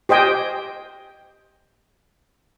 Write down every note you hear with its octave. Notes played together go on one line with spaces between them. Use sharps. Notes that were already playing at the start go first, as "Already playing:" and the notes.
G4 C5 D#5 G5 G#5